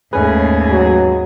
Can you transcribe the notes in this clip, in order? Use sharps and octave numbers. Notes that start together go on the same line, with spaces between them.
D#2 G#2 A3 C#4 G#4 B4
F#3